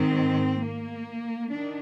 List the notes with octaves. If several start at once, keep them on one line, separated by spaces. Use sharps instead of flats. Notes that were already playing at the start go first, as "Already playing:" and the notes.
Already playing: G#2 D#3 C4
A#3
D#3 D4